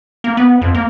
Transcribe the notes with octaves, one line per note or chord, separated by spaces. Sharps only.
A#3
B3
F2
A#3